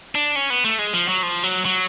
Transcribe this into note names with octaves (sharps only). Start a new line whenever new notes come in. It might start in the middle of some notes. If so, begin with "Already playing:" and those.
D4
C#4
B3
A3
G#3
F3
F#3
F3
F#3
F#3